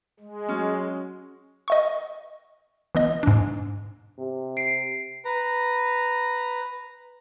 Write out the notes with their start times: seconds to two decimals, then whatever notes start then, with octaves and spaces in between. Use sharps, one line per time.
0.20 G#3
0.49 F#3 C#4
1.68 D#5 E5 C#6
2.95 E3 B3 D#5
3.23 G#2 D4
4.19 C3
4.57 C7 D7
5.25 B4 A#5